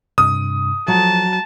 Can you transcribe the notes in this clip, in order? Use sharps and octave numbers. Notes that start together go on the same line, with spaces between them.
G2 C3 D#6
F3 F#3 F#4 A4 A5